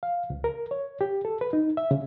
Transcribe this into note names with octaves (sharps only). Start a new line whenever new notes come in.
F5
C#2
A#4
C#5
G4
A4
B4
D#4
E5
C#3